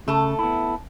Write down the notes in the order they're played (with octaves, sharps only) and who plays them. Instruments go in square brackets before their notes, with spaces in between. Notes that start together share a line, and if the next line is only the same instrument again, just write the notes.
[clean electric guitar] C#3 [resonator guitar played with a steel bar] A3 A4
[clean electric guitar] B3 E4